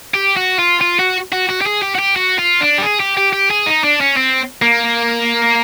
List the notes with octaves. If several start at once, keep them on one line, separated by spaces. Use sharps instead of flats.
G4
F#4
F4
F4
F#4
F#4
F#4
G4
G#4
G4
F#4
G4
F#4
F4
D4
G4
G#4
G4
G4
G4
G#4
D#4
D4
C#4
C4
A#3